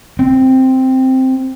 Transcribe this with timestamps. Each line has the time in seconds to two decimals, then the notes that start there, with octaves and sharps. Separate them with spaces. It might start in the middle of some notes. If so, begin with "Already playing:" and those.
0.19 C4